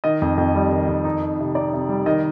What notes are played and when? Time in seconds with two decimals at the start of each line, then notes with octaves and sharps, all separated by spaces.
0.04 D#3 D#5
0.22 F2
0.38 F2
0.55 G3
0.72 D#3
0.89 F2
1.05 D#4
1.22 D#4
1.39 C3
1.55 D#4 D5
1.73 C3
1.89 G3
2.06 D#3 D#5